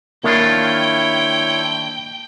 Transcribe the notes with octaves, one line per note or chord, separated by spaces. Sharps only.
D#3 A#3 D4 E4 F4 C#5 G5